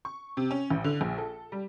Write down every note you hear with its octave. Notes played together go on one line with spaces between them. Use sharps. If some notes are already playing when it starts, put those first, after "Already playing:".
C#6
C3
C#4
A1
D3
A#1
A4
G3